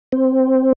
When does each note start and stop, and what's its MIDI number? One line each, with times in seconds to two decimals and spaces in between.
0.12 0.73 60